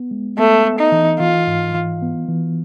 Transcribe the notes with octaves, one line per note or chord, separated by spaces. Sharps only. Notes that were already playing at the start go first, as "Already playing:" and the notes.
Already playing: B3
G#3
A3 B3
B3
D#4
E3
E3 F4
G#2
E3
B3
E3